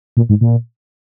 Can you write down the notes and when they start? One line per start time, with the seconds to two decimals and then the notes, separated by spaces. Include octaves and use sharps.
0.17 A#2
0.29 G#2
0.41 A#2